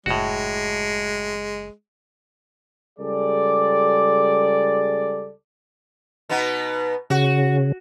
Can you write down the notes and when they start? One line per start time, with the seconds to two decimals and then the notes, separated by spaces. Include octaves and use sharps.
0.06 F#1 A2 G#3 F#4
2.99 C#2 G3 G#4 A4 D5
6.29 B2 B3 D#4
7.10 C#3 F#4